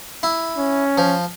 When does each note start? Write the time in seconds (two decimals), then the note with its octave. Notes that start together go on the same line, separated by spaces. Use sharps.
0.23 E4
0.58 C#4
0.98 F3